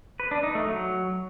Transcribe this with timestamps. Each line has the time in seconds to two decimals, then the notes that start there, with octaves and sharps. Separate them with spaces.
0.20 B4
0.31 D4
0.43 D#4
0.55 A3
0.67 F#3